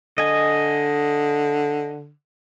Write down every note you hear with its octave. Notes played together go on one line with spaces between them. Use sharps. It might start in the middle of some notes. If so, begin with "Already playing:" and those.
D3 D#5 G#5